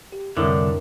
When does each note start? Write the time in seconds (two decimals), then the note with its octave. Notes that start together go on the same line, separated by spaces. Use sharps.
0.12 G4
0.37 C2 F2 A2 D3 A4 A#4